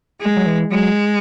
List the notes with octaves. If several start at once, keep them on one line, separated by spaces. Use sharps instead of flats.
G#3
F#3
E3
F#3 G#3